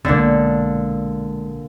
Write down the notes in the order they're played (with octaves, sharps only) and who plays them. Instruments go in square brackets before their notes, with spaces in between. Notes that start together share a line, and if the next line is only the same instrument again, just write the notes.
[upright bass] B1 G#3 [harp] A#2 D3